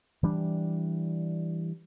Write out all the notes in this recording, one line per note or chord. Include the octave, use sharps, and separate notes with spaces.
E3 G3 D4